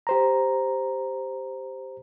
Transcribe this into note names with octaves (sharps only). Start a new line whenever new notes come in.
G4 C5 A#5